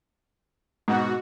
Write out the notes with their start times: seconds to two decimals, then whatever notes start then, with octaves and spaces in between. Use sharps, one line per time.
0.88 G#2 B2 F#4